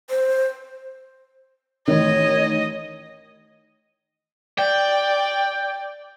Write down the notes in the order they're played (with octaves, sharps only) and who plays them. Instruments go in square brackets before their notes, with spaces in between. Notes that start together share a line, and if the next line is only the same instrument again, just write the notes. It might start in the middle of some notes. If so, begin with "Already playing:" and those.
[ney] C5
[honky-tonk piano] A1 D#3 [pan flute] C#5 [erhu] D#5
[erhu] D5 [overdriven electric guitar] G5